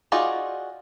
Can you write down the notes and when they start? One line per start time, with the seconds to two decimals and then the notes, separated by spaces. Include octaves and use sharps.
0.12 D#4 F4 F#4 G#4 D5